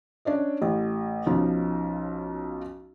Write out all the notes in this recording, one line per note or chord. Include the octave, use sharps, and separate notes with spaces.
C#4 D4 C#5 D#5
A1
B1 F3 C#4 D#4